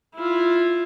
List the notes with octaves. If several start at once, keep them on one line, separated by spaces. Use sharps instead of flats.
E4 F4